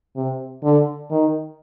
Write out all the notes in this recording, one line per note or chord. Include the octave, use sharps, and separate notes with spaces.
C3
D3
D#3